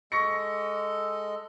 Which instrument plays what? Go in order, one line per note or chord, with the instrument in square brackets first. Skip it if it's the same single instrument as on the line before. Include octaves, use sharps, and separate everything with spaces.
[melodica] G#3 A4 D#5 [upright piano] C#6 A#6 C#7